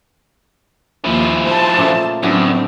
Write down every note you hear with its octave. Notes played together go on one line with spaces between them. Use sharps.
D#2 F3 E4 F4
C5 A5
A#2 C#3 A3
F#2 A2 D3 F#3 B3 C4 D4